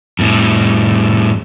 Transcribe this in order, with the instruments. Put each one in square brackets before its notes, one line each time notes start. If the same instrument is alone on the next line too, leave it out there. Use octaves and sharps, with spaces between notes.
[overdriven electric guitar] F2 A2